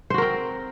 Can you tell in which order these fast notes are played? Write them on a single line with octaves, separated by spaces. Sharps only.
C5 F#4 A#4 C4